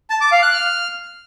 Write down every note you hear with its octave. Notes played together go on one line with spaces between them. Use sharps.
A5
D6
F5
F#6
F6